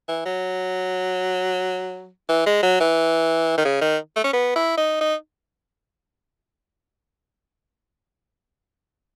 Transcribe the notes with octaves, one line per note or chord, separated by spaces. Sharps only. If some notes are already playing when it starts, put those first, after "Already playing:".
E3
F#3
E3
G#3
F#3
E3
D#3
C#3
D#3
A3
C#4
B3
E4
D#4
D#4